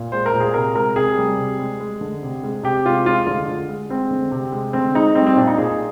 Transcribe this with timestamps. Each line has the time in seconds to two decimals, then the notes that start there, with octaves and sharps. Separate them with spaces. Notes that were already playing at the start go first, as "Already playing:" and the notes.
Already playing: A#2
0.12 G#3 C5
0.26 A#4
0.34 A#2
0.40 G#4
0.54 C3 A#4
0.76 G#3 A#4
0.96 C3 G#4
1.18 G3
1.38 C3
1.59 G#3
1.80 G#3
2.01 D3
2.23 C3
2.44 G#3
2.64 C3 G4
2.86 G#3 F4
3.05 G#3 F4
3.26 D3 F4
3.48 D3
3.69 G#3
3.90 G#3 C4
4.11 D3
4.32 C3
4.52 G#3
4.73 D3 C4
4.95 G#3 D#4
5.15 G3 C4
5.26 C4
5.36 A#2 D4
5.47 D#4
5.58 A#2 G#4